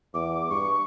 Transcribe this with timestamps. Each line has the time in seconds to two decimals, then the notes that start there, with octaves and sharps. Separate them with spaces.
0.14 E2 D6
0.50 G2 C#6